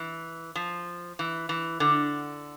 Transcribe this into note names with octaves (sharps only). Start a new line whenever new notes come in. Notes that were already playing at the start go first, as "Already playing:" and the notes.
Already playing: E3
F3
E3
E3
D3